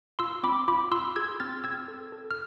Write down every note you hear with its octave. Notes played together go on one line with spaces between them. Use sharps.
F4 C6 E6
C4 B5 D6
F4 B5 D6
F4 C6 E6
G#4 E6 G#6
C4 F6 A6
C4 E6 G#6
A4
A4
F6